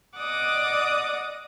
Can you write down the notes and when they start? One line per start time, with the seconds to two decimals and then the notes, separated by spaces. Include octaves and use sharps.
0.18 D5 D#5 F#5 D6 D#6